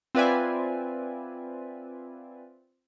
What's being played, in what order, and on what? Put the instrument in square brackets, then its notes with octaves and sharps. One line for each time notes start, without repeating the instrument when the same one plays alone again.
[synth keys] C4 F4 B4 D5 E5 G#5